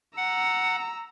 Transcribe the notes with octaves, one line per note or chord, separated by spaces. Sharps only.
F#5 A#5 E6